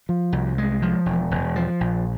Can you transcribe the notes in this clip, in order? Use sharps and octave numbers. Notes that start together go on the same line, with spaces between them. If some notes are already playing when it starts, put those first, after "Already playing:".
F3
C2
G#3
F3
E1
E1
F3
A#1